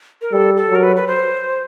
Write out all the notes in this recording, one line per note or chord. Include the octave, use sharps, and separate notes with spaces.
A#4
G3 A4
A4
F#3
A#4
B4
B4
C5